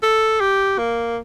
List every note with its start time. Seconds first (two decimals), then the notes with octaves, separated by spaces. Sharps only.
0.02 A4
0.40 G4
0.79 A#3